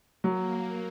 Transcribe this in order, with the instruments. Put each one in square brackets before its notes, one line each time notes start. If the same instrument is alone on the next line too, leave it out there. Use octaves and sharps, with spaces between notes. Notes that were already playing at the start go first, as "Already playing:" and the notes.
[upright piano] F#3 [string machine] A#3